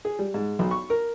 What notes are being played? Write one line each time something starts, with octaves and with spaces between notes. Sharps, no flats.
G#4
G3
G#2
B1
C#6
A#4